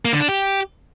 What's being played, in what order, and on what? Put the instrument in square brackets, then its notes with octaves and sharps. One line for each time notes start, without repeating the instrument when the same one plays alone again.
[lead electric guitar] A#3
D3
D4
G4